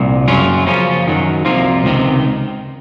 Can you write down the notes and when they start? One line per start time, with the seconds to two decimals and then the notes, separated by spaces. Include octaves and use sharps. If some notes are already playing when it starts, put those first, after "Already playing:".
Already playing: C2 A#2
0.28 F#2 C#3 F#3 C#4 F4
0.66 C#3 F3 A#3 C#4 F4
1.07 F#2 D#3 F#3
1.45 C2 C3 F3 A#3 F4
1.84 C#2 C3 D#3